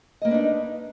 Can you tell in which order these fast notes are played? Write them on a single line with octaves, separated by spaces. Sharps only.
D#5 A#3 B4 D4 D#4